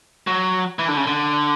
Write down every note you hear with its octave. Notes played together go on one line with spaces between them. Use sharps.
F#3
E3
D3
C#3
D3